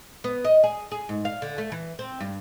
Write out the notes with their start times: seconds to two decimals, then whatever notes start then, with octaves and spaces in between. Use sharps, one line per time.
0.24 B3
0.45 D#5
0.64 G#4
0.91 G#4
1.09 G#2
1.25 F5
1.42 D3
1.58 A3
1.72 E3
1.99 C4
2.20 G2